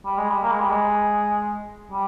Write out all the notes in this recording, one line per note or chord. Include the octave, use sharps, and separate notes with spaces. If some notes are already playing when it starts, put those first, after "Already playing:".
G3
G#3
G3
A#3
G#3
G3
G#3
G3